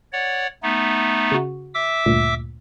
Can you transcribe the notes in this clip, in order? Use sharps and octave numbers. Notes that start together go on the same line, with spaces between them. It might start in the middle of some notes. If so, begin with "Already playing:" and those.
C#5 D5 F#5
A3 B3 D#4
C#3 F#4
E5 D6 E6
D2 G2 A#2